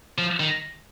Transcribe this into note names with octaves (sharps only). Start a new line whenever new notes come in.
F3
D#3